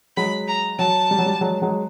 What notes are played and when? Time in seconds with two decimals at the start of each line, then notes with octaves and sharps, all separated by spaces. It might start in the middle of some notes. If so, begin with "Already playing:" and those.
0.17 F#3 G#3 B5
0.48 A#5
0.79 F#3 A5
1.11 G3
1.19 F#3
1.26 G3
1.41 F#3 G#3
1.62 F#3 G#3